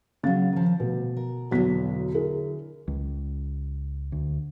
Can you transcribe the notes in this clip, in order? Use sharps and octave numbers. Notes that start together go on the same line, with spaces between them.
C#3 F#3 F5 A6
D#3 F3
D2 B2
A#4
B1 E2 D3 F#3 B6
E4 G#4 A#4
C#2
D2